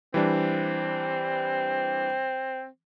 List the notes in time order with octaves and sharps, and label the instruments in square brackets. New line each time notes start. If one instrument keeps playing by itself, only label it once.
[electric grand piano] E3 G3 D4 [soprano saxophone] C4